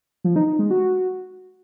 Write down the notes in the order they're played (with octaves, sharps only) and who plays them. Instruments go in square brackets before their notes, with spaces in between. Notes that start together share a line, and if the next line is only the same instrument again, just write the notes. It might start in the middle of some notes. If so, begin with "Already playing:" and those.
[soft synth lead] F3
D#4
D#4
G#3
F#4